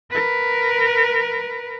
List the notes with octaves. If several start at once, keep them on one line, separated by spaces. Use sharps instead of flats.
A#4 B4